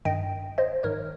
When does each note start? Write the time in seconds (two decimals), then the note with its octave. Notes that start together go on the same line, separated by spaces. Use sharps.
0.05 G2 D#3 D#5 G5
0.58 C5 D#5
0.83 G#2 D#3 A#4 C#5